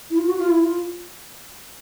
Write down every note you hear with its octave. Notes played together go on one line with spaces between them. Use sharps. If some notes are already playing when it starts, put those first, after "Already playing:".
E4
F4
F#4
F4
E4
F4